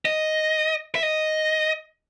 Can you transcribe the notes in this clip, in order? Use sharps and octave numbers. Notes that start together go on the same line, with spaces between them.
D#5
E5
D#5